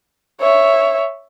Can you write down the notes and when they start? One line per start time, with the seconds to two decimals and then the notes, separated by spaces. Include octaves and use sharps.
0.41 C#5 E5